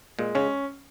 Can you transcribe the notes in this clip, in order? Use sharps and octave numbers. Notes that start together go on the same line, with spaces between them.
A#2 G#3
C#3 C#4